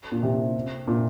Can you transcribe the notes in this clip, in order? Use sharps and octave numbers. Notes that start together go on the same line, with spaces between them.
A#2
C3
A#2